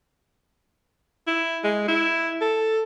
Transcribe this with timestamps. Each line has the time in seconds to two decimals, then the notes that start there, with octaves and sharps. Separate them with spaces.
1.27 E4
1.64 G#3
1.88 E4
2.41 A4